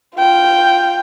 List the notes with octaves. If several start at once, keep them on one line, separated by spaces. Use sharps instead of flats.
F4 G5